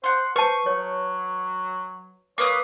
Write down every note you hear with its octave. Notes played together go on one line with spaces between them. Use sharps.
C5 F#5 C6
B4 C5 A5 C#6
F#3 C#5
A#3 B4 C#5 D6 D#6